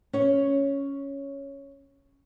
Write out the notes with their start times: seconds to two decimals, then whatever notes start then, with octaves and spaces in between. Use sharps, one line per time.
0.13 C#4 C#5